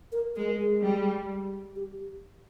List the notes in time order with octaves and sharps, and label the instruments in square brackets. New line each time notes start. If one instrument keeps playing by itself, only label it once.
[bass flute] A#4
[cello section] G#3 [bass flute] A#4
[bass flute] G#4
[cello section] G3
[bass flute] G4